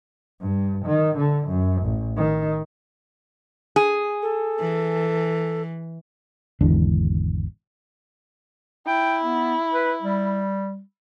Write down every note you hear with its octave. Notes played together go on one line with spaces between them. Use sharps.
G2
D#3
D3
F#2
A1
D#3
G#4
A4
E3
G#1 E2 D3 D4
E4 G5
B3
B4
G3